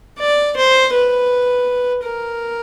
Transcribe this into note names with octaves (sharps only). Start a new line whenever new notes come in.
D5
C5
B4
A#4